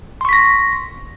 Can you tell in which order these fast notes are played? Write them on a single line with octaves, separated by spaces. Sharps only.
C6 C#6 B6 A#6